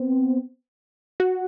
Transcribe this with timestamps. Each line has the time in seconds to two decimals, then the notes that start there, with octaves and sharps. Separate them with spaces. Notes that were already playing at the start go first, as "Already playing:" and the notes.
Already playing: B3 C4
1.20 F#4